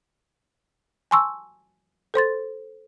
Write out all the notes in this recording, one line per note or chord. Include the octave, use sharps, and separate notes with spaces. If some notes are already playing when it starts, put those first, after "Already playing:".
G#5 A5 C6 C#6 E6
A4 C5 C6 A6